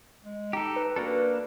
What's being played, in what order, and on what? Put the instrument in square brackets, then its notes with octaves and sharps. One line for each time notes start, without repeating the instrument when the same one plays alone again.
[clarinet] G#3
[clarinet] D#4 [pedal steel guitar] G4 A4
[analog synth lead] B4
[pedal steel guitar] A#3 D4 A4 [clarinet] F#4